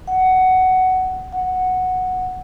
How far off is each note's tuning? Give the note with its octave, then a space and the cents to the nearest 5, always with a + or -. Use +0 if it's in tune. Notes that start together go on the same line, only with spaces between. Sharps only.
F#5 +10
F#5 -5